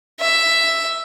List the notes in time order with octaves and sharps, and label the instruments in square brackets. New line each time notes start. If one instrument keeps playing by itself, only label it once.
[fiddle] E5